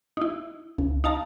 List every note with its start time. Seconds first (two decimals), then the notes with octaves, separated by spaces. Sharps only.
0.17 D#4 E4
0.78 C#2
1.04 D#4 F5 A5 A#5